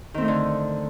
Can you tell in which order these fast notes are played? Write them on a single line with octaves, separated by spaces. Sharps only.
D#3 C4 A3 D#4 D3